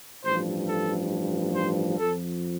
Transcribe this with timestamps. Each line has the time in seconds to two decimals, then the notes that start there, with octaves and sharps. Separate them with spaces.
0.24 A1 G2 F3 C5
0.68 A4
1.56 C5
1.99 F2 F3 A4